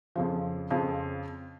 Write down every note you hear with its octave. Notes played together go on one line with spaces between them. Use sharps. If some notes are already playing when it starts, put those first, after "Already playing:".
F2 C#3 F3
F2 C#3 F3